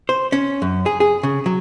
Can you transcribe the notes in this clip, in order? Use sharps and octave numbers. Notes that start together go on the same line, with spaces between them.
C5
C#4
F#2
G#4
G#4
C#3
F#3